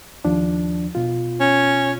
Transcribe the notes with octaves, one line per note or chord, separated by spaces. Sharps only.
D#2 F3 D4
B2 F4
C#4